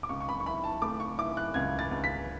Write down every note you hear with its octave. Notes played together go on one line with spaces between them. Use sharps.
D6
C#2 C#6
C#6
B5
C#6
E4 B5
A5
A3 D6
C#6
E4 D6
F#6
C#2 G#6
A6
C#2
B6